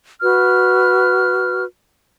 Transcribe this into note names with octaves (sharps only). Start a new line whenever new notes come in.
F#4 B4 F6